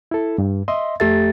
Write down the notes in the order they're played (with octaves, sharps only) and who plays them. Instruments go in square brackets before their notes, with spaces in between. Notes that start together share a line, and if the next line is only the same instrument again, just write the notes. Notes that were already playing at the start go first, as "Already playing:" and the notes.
[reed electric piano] E4 A4
G2
D#5 E5 C6
[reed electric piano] F2 A4 E5 [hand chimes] A3 G4 A6